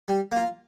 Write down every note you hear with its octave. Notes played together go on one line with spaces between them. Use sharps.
G3
A#3 F4